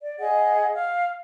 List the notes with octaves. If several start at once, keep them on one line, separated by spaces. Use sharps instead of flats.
D5
G#4 D#5 F#5
F5